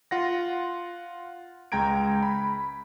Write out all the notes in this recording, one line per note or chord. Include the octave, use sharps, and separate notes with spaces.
F4 F#5 A#6
C#2 G#3 G5 A#5 G#6 D7
B5